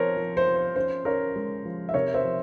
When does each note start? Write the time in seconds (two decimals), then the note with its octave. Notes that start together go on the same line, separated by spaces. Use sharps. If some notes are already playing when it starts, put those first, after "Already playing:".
Already playing: F3 C4 A#4 C5 C#5
0.17 F3
0.37 C5
0.47 F3
0.56 C5
0.76 C#4 C5
1.05 C#4 A#4 C#5
1.36 G#3
1.65 F3
1.89 E5
1.94 C3 A#4 C#5
2.14 C5 E5
2.25 F3